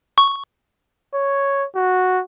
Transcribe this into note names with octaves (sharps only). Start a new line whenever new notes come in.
C#6
C#5
F#4